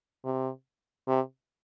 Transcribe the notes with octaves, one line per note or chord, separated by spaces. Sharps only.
C3
C3